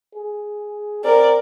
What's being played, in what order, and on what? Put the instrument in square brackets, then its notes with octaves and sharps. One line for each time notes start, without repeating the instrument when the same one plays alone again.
[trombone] G#4
[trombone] C4 [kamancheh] A#4 D5